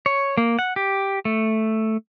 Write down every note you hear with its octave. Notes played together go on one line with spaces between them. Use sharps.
C#5
A#3
F#5
G4
A3